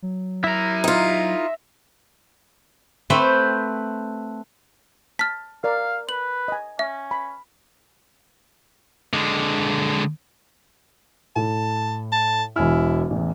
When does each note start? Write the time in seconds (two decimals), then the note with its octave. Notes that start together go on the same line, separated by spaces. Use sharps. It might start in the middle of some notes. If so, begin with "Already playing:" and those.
0.02 F#3
0.44 E4 A#4 E5 A#5
0.84 D#4 F4
3.10 A3 C4 B4 G5
5.19 A5 F6 B6
5.64 A#4 D5 F5
6.09 B4 F#7
6.48 D#5 G#5
6.79 C#4 E5
7.11 B5
9.13 D3 G#3
11.36 A2 A5
12.12 A5
12.56 E1 E4 G#5 F6
13.10 A1 E2